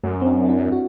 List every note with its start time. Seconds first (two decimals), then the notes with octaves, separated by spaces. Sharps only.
0.03 F#2 A3
0.22 C4
0.27 D4
0.45 D4
0.49 E4
0.72 F#4